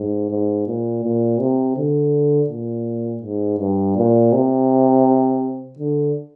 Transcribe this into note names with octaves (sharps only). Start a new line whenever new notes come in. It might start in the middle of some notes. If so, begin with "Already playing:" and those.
Already playing: G#2
G#2
A#2
A#2
C3
D3
A#2
G#2
G2
A#2
C3
D3